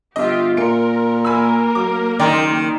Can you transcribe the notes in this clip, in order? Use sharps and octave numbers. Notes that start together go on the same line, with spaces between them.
G1 F4 G4 D#5 E5
A#2 A#4 C6 C#7 D7
A#3 A#4 G#5 B5 E6
F#3 D6
F#1 D#3 D5 G5 C6